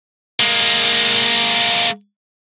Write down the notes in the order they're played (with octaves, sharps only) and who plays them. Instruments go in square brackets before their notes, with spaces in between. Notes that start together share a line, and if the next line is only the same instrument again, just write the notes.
[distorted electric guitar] G#3 A#3